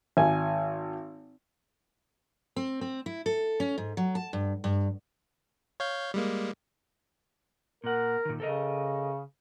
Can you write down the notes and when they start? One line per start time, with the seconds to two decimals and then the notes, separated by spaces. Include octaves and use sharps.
0.17 G#1 G#5
2.56 C4
2.81 C4
3.06 E4
3.26 A4
3.60 C#4
3.78 G#2
3.97 F#3
4.15 A5
4.33 G2
4.64 G2
5.80 C#5 F5 G6
6.14 G3 G#3 A#3
7.84 A#2 A#4 F#5
8.25 A#2 D#3
8.40 C#3 A4 A#4 D#5